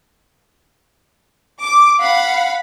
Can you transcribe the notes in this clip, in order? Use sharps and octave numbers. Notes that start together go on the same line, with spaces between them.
D6
F5 F#5 B5